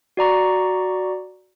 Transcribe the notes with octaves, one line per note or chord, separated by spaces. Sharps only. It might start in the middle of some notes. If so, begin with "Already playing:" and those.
F#4 D5 A#5 C#6